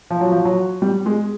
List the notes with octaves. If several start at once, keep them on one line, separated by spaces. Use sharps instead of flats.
F3
F#3
F3
F#3
G3
G#3